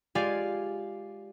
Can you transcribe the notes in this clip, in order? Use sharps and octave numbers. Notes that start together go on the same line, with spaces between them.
G#3 F4 G4 D5 F5 G#5